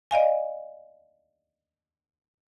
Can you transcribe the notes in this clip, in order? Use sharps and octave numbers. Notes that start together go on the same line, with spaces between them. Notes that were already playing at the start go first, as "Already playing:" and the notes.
D5 D#5 F5 G#5